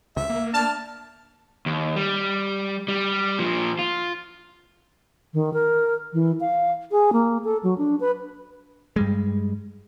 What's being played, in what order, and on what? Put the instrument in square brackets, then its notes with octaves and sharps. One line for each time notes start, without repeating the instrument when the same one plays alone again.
[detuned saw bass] C#2 [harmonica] E5
[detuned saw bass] A#3
[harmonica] D4 F6 [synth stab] A5
[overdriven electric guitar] D#2
G3
G3
A#2 F3
F4
[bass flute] D#3
A#4
E3
F5
G#4
A#3
A4
F#3
D4
B4
[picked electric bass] G2 G3 G#3